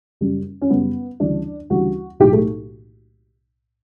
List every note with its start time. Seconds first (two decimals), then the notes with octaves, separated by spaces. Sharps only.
0.21 F#2 C#3 G3
0.62 C#4
0.70 F#2 C#3 G3 B3
1.20 D2 C#3 E3 G3 D4
1.70 D2 C#3 E3 G3 F#4
2.20 B1 A2 F#3 G4
2.33 A3